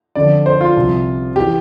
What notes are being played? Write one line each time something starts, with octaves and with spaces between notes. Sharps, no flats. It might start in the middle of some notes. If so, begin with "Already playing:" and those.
F2 D3 F3 D5
C5
F4
C2 C3 F3
E3 G4